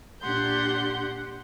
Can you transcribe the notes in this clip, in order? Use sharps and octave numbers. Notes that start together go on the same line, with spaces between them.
A#2 D4 G4 F#5 C6 G6